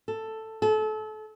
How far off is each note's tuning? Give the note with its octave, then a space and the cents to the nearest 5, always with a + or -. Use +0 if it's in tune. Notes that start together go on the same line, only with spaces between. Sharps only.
A4 +5
A4 -30